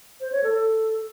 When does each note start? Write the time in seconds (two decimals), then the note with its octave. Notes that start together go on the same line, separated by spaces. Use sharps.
0.21 C5
0.32 C#5
0.44 A4